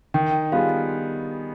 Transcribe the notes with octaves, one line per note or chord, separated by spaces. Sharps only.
D#3 G5
G3 B3 F4 G#4 F5